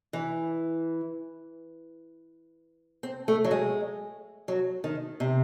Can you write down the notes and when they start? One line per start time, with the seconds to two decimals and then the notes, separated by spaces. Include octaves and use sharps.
0.13 E3
3.03 C4
3.28 A3
3.45 F#3
3.51 G#3
4.48 F#3
4.84 D#3
5.20 C3